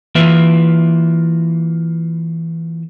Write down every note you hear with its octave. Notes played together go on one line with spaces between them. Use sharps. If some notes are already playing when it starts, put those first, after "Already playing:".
E3 A#3 F4 B4 E5